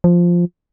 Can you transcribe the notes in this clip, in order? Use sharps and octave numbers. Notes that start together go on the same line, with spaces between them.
F3